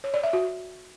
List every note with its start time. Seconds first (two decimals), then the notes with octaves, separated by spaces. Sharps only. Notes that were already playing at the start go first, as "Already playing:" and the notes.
0.04 C#5
0.14 D5
0.24 E5
0.33 F#4